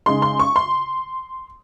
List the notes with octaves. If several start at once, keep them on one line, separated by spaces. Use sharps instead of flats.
C#3 G#3 D#4 C6
C6
C#6
C6